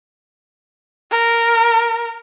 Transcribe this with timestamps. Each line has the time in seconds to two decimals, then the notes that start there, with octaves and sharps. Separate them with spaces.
1.11 A#4